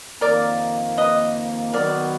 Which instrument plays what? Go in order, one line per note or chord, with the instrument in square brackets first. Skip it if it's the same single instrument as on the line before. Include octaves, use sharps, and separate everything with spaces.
[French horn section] F2 D#3 A#3 [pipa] A#4 D5
[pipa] B4 D#5
[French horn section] D#3 F#3 B3 [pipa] A#4 D5